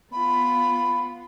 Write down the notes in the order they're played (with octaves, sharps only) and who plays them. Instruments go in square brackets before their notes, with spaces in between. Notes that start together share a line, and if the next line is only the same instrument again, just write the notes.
[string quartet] B3 F4 [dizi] B5